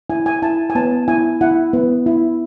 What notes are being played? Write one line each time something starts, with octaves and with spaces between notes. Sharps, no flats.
E4 G#5
G#5
E4 A5
G#5
B3 A5
E4 G#5
E4 F#5
B3
E4